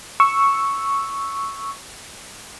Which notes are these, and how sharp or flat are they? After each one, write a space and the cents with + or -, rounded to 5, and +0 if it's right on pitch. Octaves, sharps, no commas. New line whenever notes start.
C#6 +0 E6 +0